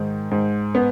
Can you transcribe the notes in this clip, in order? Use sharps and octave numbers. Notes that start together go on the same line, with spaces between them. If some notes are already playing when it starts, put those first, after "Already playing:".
Already playing: G#2 D#3
G#2
B3